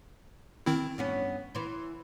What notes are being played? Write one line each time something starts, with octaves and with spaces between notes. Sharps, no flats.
D#3 C4 E4
G2 B3 C#4
E3 C5